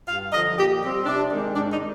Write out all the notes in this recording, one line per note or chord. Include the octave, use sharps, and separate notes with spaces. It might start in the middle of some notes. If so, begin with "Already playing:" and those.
G2 F5
D3 F3 D#5
A#2 G4
G3 C4 G4
C3 D4
D#3 G#3 C4
G#2 D4
D#4